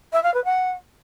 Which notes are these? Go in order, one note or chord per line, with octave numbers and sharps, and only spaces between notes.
E5
F5
B4
F#5